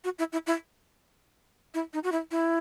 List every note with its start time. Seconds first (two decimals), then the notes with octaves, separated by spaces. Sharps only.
0.04 F#4
0.19 E4
0.32 E4
0.47 E4
1.74 E4
1.93 D#4
2.03 F#4
2.12 E4
2.31 E4